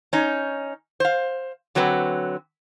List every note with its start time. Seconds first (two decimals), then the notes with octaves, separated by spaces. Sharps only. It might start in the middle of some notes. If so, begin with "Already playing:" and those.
0.13 C#4 D#4
1.00 C5 F5
1.75 D3 F#3 C4 B4